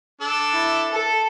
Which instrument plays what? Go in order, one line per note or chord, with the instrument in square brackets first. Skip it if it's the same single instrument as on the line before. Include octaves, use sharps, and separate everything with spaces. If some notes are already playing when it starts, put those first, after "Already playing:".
[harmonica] D4 A4
[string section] E4
A4